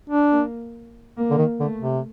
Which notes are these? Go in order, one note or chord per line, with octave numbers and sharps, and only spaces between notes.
D4
A#3
A#3
D3
D#3
D3 A3
C3